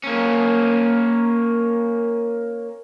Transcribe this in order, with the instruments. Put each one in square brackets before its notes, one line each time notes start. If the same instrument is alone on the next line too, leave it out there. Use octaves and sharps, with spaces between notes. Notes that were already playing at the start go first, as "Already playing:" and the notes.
[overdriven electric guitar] A#3 C#4